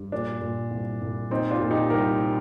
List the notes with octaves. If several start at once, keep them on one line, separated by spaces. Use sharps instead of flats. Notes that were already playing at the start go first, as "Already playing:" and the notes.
Already playing: G2
A#2 D4
A#2
C2
C2
A#2 C4 D#4
D4 F4
A#2
D#4 G4
C2 G4 A#4